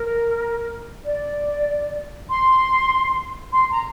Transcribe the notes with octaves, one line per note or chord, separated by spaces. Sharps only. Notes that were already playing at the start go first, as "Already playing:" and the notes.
Already playing: A#4
D5
C6
C6
A#5